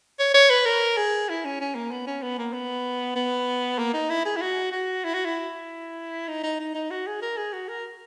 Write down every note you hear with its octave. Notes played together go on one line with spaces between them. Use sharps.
C#5
C#5
B4
A#4
G#4
E4
C#4
C#4
A#3
B3
C#4
B3
A#3
B3
B3
A#3
D#4
E4
G#4
E4
F#4
F#4
E4
F#4
E4
D#4
D#4
D#4
D#4
F#4
G#4
A#4
G#4
F#4
A#4